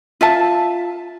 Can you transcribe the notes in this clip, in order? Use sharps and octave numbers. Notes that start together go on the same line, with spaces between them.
F4 E5 A5